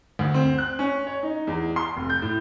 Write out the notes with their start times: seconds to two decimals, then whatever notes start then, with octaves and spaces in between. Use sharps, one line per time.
0.19 D2
0.34 C4
0.58 F#6
0.79 C#4
1.07 C#5
1.23 D#4
1.47 E2
1.76 C6
1.97 F1
2.10 G6
2.22 A2